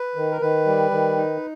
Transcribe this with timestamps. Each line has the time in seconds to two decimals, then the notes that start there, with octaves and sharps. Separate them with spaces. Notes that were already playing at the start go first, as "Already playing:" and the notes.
Already playing: B4
0.16 D#3
0.31 A#4
0.41 D#3 B4
0.66 G3
0.91 D#3
1.17 D#4